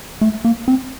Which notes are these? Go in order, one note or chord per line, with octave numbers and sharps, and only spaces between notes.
A3
A#3
C4